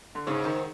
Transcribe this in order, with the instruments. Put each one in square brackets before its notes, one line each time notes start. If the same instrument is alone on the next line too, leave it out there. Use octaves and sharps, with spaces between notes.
[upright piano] D3
[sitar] G#2 [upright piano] C#3
[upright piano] D#3